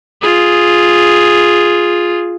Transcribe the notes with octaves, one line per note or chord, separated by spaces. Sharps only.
F4 G#4